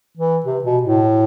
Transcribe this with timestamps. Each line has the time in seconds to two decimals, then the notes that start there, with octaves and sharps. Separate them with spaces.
0.17 E3
0.45 C3
0.64 B2
0.83 A2